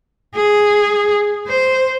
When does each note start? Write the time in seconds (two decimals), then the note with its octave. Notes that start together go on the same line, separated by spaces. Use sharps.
0.35 G#4
1.48 C5